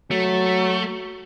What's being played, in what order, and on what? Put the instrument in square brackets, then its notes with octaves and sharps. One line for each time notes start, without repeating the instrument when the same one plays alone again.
[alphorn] F#3 [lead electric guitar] A3